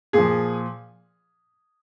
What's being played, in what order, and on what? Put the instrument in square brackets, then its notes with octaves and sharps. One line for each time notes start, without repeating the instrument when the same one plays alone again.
[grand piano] A#2 F3 G#4